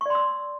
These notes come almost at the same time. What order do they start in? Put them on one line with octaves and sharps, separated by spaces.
C#6 D5 C6 E6